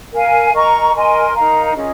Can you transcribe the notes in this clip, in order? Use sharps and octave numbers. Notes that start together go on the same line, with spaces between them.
A#4 F5 G#5
A#4 D#5 A#5 C#6
A#4 D#5 G#5 C6
D#4 A#4 F5 A#5
C#4 F4 G#4 D#5